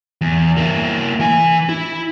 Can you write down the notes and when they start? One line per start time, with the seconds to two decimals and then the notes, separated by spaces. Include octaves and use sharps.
0.21 E2
0.57 A#3 E4
1.20 E3 G#5
1.69 E4